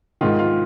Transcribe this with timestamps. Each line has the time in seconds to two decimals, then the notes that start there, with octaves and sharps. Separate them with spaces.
0.21 G#2 D#3 F4
0.39 F4